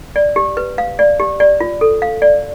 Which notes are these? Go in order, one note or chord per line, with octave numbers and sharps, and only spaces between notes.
D5
G4
B4
F5
D5
G4
D5
F4
A4
F5
D5